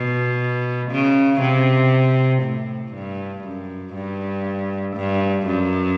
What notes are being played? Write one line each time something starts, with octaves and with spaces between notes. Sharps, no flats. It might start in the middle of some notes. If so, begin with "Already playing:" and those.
Already playing: B2
C#3
C3
A2
G2
F#2
G2
G2
F#2